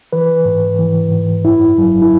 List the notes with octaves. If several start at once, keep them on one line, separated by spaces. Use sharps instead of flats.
E3 B4
G#2
E3
G#2
F#2 E4
F#3
E4